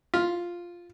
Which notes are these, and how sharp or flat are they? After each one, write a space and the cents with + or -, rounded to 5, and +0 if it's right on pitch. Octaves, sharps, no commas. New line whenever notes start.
F4 +0